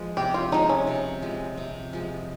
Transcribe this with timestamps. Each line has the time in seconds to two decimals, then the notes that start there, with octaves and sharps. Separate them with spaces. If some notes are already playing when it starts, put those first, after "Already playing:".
Already playing: F3 G#3
0.17 C3 G4
0.34 F4
0.52 F3 G#3 D#4
0.69 C#4
0.87 C3
1.22 F3 G#3
1.57 C3
1.93 F3 G#3